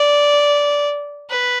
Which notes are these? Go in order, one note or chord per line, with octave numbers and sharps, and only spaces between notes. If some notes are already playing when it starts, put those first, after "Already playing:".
Already playing: D5
B4